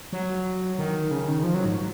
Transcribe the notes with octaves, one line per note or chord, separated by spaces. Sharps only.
F#3
D#3
C#3
D#3
F3
F#3
G#2